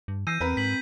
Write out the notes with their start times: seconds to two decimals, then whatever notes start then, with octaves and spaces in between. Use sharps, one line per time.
0.08 G2
0.27 E3 E6 G6 A#6 C7 D#7
0.41 E2 C4 A#4 B4
0.57 G#2 B6 F#7